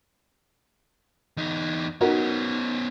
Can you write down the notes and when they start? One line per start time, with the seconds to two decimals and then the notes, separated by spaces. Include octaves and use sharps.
1.37 E2 D#4
2.01 B3 C#4 D#4 F#4 A#4